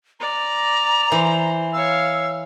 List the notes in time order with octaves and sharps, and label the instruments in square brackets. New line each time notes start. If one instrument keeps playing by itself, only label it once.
[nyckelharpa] D5 [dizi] A#5
[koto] E3 [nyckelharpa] C5
[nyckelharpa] C#5 F5 [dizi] E6